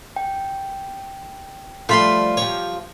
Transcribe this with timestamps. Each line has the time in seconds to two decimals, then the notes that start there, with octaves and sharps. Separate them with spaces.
0.16 G5
1.89 F3 G3 A3 F4 C5 B5 C6
2.37 F3 G4 C#5